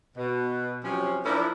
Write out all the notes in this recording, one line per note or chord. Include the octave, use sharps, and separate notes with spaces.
B2
C3 F3 F#3 C#4
F3 A#3 D4 E4 A#4